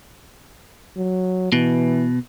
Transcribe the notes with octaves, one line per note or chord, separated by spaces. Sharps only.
F#3
B2 E3